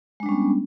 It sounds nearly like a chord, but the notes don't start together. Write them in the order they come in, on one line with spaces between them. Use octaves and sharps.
G#3 D4 G3 C#4 B3